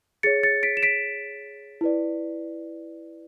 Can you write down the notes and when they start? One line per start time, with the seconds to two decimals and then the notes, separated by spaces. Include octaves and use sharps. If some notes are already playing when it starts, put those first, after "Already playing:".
0.23 G#4 C#5 A6 C#7
0.43 A6 C#7
0.63 B6 D7
0.77 E7
0.83 B6 D7
1.81 E4 B4 D5